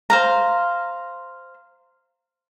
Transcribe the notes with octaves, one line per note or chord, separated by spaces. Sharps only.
C5 F5 A#5